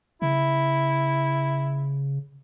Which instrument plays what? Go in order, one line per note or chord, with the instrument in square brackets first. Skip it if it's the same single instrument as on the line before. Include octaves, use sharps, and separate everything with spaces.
[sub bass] C#3 [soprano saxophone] E4